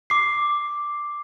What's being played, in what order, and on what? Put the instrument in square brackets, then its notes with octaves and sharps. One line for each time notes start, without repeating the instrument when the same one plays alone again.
[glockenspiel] D6 C7